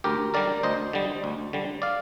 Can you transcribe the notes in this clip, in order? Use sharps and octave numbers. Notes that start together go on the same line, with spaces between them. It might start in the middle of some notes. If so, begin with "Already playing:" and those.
D2 G4 A#4
D3 G3 A#4 D5
D2 C5 D#5
D3 G3
D2
D3 G3
D5 F5